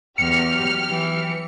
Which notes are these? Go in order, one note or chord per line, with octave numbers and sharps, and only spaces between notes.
E2 F#3 G4 F6 C#7
E3